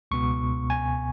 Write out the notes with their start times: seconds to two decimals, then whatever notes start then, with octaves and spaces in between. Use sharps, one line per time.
0.11 C#2 B2 B3 C#6
0.70 G#5